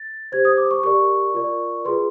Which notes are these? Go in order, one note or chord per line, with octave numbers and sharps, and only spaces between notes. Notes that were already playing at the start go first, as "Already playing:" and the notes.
Already playing: A6
G4 C5 G#6
D#6
D6
C#6
G4 A#4 D5 C#6
F4 A#4 D5
F4 G#4 B4 C6